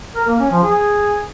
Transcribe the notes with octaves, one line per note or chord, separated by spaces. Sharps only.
A#4
A#3
C#4
F3
G#4